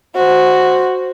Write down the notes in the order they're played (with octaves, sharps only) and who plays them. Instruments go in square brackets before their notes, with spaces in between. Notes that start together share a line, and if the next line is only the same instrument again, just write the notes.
[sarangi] F#4 [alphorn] C5